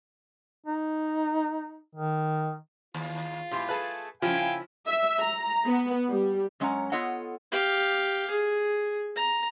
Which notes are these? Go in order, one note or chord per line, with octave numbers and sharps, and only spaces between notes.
D#4
D#3
D#2 F4
A#2 E4 G4 C6
A3 G#4 A4 B4
C#3 F3 C#4 E4 F5 G5 G#5
E5
A#5
B3
G3
F#2 G#3 C#4 C#5 F#5 A#5
B3 F4 A4 C#5 D#5 F#5
G4 F5
G#4
A#5